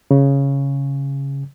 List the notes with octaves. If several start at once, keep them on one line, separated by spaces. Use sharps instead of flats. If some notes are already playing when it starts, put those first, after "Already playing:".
C#3